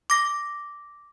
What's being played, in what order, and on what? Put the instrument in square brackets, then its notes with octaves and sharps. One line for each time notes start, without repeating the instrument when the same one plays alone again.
[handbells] D6 A#6